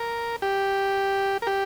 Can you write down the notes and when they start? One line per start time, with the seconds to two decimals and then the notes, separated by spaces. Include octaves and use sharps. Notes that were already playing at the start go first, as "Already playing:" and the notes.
Already playing: A#4
0.42 G4
1.42 A#4
1.47 G4